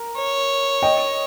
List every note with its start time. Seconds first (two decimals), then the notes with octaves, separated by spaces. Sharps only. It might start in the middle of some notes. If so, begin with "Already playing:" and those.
Already playing: A#4
0.18 C#5
0.82 D#5 G5